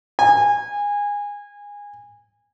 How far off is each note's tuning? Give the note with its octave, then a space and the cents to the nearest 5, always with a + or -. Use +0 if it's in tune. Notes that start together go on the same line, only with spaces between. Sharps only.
G#5 -20